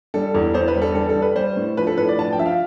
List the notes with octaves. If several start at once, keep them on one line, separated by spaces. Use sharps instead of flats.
G3 A4
E2 A4
E2 C5
B4
G3
A4
G3 A4
A4
G3
B4
G3 C5
A2
F3 B4
A4
A2 B4
D5
F3 A5
G5
F3 E5
F5